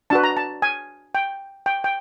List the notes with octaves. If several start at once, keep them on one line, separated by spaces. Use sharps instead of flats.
D4 F#4 B4 A5
A#5
A5
G#5
G5
G5
G5